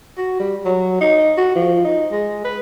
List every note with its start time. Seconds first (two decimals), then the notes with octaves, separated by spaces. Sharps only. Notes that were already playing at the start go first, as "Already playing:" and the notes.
0.18 F#4
0.40 G3
0.65 F#3
1.01 D#4
1.37 F#4
1.55 F3
1.85 D#4
2.12 G#3
2.44 B4